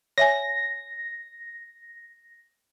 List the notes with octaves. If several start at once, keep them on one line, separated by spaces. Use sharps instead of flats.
C#5 E5 G#5 A#6